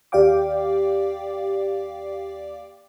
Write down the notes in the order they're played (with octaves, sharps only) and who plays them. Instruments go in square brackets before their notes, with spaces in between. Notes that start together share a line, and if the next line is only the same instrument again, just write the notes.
[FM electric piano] D#2 G4 D5 F5 G5 D6